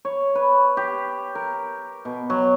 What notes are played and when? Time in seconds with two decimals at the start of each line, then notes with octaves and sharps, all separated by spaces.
0.05 C#5
0.35 B4
0.77 G4
1.35 A#4
2.05 B2
2.30 F#3